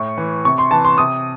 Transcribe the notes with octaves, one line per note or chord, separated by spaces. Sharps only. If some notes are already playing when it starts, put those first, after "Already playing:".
Already playing: A2 C#6
E3
C3 C#6
C6
E3 A5
C6
C3 D#6